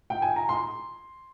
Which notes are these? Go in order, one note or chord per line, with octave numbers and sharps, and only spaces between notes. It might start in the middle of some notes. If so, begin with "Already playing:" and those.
G5
G#5
A#5
C6